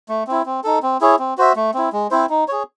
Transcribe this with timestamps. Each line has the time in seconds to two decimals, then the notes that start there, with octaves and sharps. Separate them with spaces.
0.09 A3
0.27 C4 E4
0.46 C4
0.64 D#4 A4
0.83 C4
1.01 E4 G#4 C#5
1.19 C4
1.38 F#4 C5 E5
1.56 A3
1.74 C4 E4
1.93 G#3
2.11 C4 E4 C5
2.30 D#4
2.48 G#4 C#5